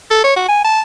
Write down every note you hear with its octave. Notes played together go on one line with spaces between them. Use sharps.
A4
C#5
F#4
G#5
A5